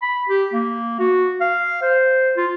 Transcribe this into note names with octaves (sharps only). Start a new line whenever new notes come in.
B5
G4
A#3
F#4
F5
C5
F4